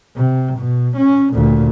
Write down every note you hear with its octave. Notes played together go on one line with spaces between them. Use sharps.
C3
B2
C#4
D2 A#2